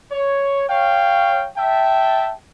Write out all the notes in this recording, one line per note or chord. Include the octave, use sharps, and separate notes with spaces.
C#5
C#5 F5 G5
E5 G5 A5